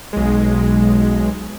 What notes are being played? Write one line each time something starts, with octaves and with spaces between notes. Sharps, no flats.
B1 G#3